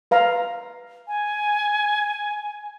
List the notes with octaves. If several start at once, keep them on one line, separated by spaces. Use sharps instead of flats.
B4 F5 A#5
G#5